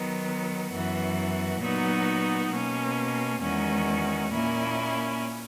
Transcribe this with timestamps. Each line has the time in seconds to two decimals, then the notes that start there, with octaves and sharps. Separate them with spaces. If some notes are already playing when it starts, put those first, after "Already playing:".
Already playing: D#3 F#3 B3
0.71 F#2 E3 B3 F#4
1.61 A#2 F#3 B3 D#4 F#4
2.51 B2 A#3 C#4
3.42 E2 D#3 G#3 C#4 F#4
4.32 A#2 A#3 C#4 E4